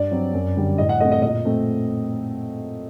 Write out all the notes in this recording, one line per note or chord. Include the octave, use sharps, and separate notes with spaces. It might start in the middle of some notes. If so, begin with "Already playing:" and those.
Already playing: G2 D5
F#3 C4
F#2
D3 G3
A2 D#5
F#5
A3 C4 D#5
D#5
A#2 D#5
A3 C4